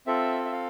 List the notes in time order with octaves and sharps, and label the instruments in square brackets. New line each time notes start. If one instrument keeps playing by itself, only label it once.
[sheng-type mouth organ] C4 F4 A4 E5
E5
F5